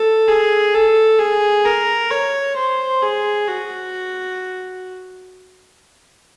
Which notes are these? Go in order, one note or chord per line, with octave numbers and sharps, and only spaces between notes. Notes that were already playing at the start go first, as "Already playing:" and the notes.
Already playing: A4
G#4
A4
G#4
A#4
C#5
C5
G#4
F#4